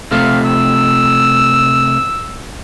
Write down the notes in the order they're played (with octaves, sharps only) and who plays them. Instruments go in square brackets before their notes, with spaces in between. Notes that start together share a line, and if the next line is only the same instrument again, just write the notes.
[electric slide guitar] C3 A3 [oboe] F5
[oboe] E6